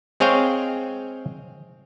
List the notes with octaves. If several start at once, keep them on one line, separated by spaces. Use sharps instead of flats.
G#3 C4 G#4 C#5 F5 G5